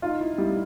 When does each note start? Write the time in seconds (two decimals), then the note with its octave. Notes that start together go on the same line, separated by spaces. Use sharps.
0.02 D#4 F4
0.21 E4
0.38 G3 E4